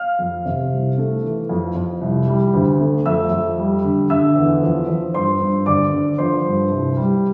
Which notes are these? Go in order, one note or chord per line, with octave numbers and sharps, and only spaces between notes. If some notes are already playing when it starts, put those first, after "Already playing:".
Already playing: F5 F6
F2
C3
C2
A3
E3
F2
F2
C2
G3
D2
A3
F2 E5 E6
F2
G3
D3
D3 E5 E6
E2
F3
F3
G2 C5 C6
G2
D2 D5 D6
D3
F3 C5 C6
G2
C2
G3